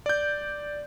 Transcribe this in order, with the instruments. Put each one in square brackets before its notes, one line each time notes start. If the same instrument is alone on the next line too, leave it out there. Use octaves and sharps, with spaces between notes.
[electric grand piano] D5 G6